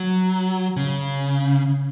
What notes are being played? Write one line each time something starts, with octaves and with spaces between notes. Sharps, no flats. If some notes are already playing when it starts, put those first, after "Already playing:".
Already playing: F#3
C#3